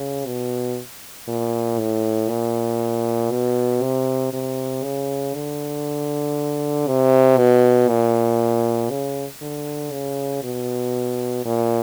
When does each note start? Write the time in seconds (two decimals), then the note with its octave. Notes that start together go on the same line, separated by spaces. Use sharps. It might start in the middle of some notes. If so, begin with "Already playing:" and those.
Already playing: C#3
0.26 B2
1.28 A#2
1.79 A2
2.29 A#2
3.31 B2
3.82 C3
4.33 C3
4.83 C#3
5.35 D3
6.87 C3
7.38 B2
7.89 A#2
8.90 C#3
9.41 D3
9.92 C#3
10.43 B2
11.45 A#2